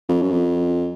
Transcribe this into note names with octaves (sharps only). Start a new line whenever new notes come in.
F2
F#2
F2